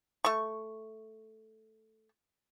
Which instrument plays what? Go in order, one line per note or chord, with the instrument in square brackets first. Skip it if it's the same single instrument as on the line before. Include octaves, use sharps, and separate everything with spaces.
[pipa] A3 C#6